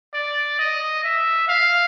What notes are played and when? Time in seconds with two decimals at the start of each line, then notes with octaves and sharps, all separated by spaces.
0.14 D5
0.59 D#5
1.04 E5
1.48 F5